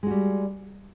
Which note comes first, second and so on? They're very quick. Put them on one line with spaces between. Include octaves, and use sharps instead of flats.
G#3 F#4 G3